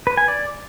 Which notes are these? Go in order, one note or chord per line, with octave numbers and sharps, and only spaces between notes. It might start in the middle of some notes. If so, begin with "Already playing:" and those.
B4
G#5
D5